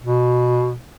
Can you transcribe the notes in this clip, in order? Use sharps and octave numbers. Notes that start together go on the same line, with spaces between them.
B2